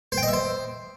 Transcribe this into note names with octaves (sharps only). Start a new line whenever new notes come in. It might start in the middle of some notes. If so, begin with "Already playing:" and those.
C5
G5
D#5
E5
C5